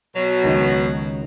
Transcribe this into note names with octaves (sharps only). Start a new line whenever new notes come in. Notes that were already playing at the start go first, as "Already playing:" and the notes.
B2 F#3
C#2 D#3